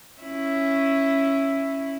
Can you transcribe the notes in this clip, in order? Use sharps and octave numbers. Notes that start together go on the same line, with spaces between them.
C#4 E4